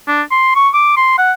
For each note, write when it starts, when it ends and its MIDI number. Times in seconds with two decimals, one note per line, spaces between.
0.07 0.22 62
0.31 0.54 84
0.55 0.69 85
0.74 0.92 86
0.97 1.15 84
1.18 1.32 78